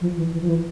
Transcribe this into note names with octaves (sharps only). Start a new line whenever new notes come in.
F3
E3
E3
F3
E3